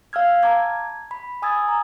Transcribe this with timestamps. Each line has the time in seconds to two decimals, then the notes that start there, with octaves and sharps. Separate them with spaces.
0.13 F5 E6 F6 G#6
0.43 A5 A#5 D6 G#6
1.11 B5
1.42 G#5 D#6 E6 G#6 A6
1.68 A#5